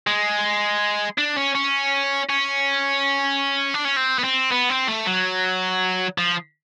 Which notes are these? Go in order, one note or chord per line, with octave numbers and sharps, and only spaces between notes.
G#3
D4
C#4
C#4
C#4
D4
C#4
C4
B3
C4
B3
C4
A3
F#3
F3